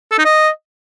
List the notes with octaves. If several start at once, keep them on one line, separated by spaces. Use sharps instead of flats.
A4
D#4
D#5